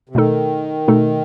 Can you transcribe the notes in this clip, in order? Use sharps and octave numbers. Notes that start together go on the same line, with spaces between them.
C3
B2 D#3 A3 D#4 A4
B2 A3 D#4 A4